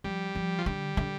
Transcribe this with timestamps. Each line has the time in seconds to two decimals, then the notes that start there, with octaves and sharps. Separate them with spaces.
0.04 F3 G3
0.35 F3
0.59 F3
0.66 D3 G3
0.97 D3